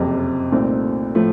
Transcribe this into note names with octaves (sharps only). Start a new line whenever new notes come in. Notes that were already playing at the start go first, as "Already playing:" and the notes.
Already playing: F#1 F2 C3
C2 A#2 A3 C4 D#4
A2 F3 A3